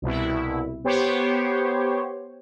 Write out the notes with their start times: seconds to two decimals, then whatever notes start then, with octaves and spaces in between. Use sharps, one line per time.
0.02 C2 B2 E4
0.84 B3 G4 C5 C#5